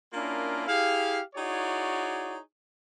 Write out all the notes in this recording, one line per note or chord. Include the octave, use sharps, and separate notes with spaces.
A#3 C#4 D4 E4 F4 A#4
E4 G4 G#4 F5
D#4 E4 F#4 G#4 C#5 D5